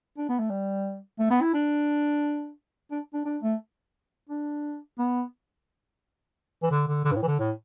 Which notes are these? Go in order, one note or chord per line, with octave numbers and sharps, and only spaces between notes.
D4
B3
A3
G3
A3
B3
E4
D4
D4
D4
D4
A3
D4
B3
E3
D3
D3
D3
G2
A2
E3
D3
A2